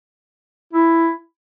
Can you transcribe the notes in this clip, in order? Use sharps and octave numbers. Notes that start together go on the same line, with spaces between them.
E4